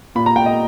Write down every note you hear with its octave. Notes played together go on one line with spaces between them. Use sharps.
A#2 B5
A#5
G5
D#5